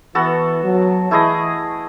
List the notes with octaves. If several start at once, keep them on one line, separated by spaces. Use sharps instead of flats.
E3 B3 F#4 A4
F#3
E3 A3 E4 G#4 D#5